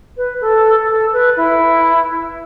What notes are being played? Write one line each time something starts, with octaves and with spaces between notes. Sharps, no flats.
B4
A4
A4
B4
E4